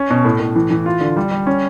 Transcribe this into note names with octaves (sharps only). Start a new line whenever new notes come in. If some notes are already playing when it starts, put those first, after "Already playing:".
Already playing: C#4
B2
A2
A2
E3
E3
F4
D3
G3
G3
C#4